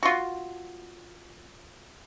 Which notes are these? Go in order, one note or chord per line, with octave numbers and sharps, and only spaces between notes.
F4 F#4